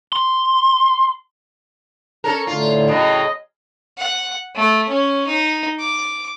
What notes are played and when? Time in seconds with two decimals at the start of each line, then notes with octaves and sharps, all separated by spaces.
0.12 C6
2.24 C#4 A4 A#4
2.47 A2 D3 F4
2.88 A2 C#3 F#3 D#5
3.98 F#5
4.55 A3
4.89 C#4
5.27 D#4
5.79 D6